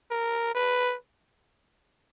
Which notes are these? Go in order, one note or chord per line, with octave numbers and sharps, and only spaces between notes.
A#4
B4